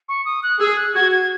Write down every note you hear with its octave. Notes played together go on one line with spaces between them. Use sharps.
C#6
D#6
F#6
G#4 E6
F#6
F#4 G#6
G#6